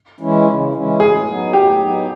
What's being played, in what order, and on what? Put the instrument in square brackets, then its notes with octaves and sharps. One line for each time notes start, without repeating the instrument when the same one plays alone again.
[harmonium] E3 G#3 C#4 E4
C#3
E3 G#3 C#4 E4
[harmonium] A2 [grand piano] G#4
[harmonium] F#3 B3 D#4
[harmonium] A2 [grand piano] G4
[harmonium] F#3 B3 D#4